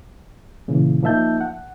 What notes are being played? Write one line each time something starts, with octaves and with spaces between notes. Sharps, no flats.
A#2 C#3 E3
F3 A#3 D#4 E5 A5 G6
F#5